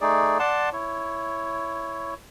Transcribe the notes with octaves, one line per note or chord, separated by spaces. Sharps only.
A3 D#4 G#4 D5
D5 F#5 A5 C6
E4 C#5